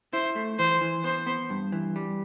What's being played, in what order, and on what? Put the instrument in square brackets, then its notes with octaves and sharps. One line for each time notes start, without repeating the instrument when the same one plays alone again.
[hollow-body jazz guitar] E4 [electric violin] C5
[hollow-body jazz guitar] A3
[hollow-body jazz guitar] E3 [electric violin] C5
[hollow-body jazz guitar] E3
[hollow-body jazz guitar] B3 [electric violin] C5
[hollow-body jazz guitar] B3
G2
E3
G3